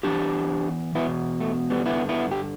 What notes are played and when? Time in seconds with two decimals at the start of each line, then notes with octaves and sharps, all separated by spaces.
0.03 E2 E3 D4 G4
0.95 E2 B2 B3 E4
1.41 A3
1.70 G3 B3
1.85 G2 D3 B3 E4
2.09 B3 E4
2.31 G4